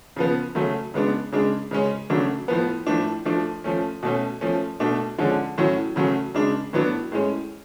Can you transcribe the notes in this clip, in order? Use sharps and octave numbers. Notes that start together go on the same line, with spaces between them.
C#3 F3 B3
C#3 F#3 A3 C#4
C#3 G#3 B3 D4
C#3 G#3 D4
C#3 G#3 C#4
C#3 F#3 A3 D4
A2 F3 B3
A2 F3 A3 D4
F3 A3 D4
F3 A3 C#4
B2 A3 C#4
F3 A3 C#4
B2 A3 D4
D3 F3 G#3 C#4
A2 F#3 C#4
C#3 F#3 A3 C#4
C#3 G#3 D4
A2 F#3 B3 D4
A2 G#3 C#4